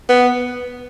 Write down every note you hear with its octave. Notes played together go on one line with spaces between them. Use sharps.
B3